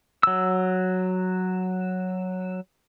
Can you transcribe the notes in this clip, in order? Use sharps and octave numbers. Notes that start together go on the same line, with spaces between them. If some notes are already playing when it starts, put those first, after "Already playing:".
F#3 E6